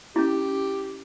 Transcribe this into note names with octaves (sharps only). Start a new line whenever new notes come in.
C#4 E4 G4